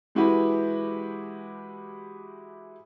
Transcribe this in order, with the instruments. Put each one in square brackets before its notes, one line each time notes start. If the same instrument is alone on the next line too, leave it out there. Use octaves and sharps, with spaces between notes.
[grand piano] E3 G#3 E4 F#4 G4 B4